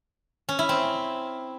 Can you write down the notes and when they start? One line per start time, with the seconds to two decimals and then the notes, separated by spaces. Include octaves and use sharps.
0.49 C#4
0.59 E4
0.69 C4